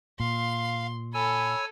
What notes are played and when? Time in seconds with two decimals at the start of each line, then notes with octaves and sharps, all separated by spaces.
0.20 A#2 F5 C6
1.14 A4 C#5 G#5 B5 E6